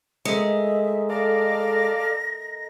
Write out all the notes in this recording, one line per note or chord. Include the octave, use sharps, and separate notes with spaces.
D#3 G#3 A3 D#4 E5
A4 D5 F5 A#6